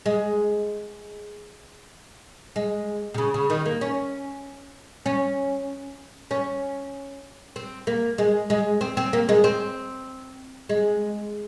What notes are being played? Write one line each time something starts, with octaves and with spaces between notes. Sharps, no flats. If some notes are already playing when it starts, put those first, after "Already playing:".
G#3
G#3
C3
C#3
C#3
D#3
A#3
C#4
C#4
C#4
C4
A#3
G#3
G#3
C4
C4
A#3
G#3
C4
G#3